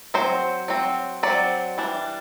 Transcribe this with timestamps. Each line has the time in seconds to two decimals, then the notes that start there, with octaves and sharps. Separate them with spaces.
0.14 F#3 C4 C5
0.68 F#3 C4
1.23 F#3 C4 D5
1.78 E3 G3 D4